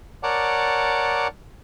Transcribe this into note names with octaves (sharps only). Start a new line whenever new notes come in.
A#4 C#5 D5 F#5 A5 D6